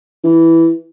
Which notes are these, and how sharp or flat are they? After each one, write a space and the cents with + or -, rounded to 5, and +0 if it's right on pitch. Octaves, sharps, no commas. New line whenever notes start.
E3 +0